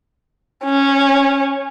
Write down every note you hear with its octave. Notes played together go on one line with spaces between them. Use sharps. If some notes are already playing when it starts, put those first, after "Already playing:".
C#4